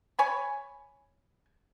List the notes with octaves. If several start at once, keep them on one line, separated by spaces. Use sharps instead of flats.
C#5 G#5 B5